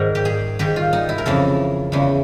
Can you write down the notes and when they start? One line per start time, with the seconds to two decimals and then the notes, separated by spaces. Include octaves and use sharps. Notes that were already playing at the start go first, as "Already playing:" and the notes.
Already playing: G#2 D#3 A#4 C5
0.15 G4
0.25 G#4
0.59 G#2 D#3 G4
0.76 F4
0.93 D#4
1.09 E4
1.18 A#4
1.26 F2 C#3 E3 A4
1.92 E2 C#3 E3